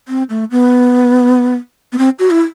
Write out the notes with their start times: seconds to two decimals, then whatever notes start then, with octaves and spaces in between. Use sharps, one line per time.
0.08 C4
0.30 A3
0.51 B3
1.93 B3
1.98 C4
2.19 F#4
2.31 E4